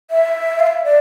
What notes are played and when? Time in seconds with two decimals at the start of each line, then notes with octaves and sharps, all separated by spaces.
0.11 E5
0.60 F5
0.67 E5
0.84 D5